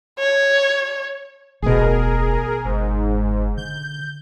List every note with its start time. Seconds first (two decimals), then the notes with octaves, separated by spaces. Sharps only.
0.19 C#5
1.62 E1 A1 B2 G#4 A#4
2.65 G1 G#2
3.57 D3 G6